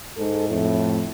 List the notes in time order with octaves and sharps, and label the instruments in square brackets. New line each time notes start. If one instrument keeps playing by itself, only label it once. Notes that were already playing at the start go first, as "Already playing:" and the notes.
[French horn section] G#2 A4
F2 A2